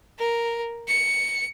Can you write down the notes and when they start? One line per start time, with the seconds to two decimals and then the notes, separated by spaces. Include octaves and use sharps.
0.19 A#4
0.88 C#7